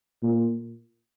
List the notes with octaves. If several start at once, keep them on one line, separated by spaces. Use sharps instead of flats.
A#2